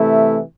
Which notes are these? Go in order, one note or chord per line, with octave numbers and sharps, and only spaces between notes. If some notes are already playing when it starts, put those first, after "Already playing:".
Already playing: C3 E3 A3 E4